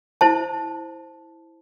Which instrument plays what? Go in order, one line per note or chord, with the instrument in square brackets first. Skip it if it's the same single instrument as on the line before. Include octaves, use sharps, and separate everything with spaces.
[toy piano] E4 C5 A5